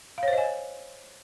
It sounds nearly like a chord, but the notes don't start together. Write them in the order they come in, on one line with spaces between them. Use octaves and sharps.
F5 C#5 C5 D#5 G#5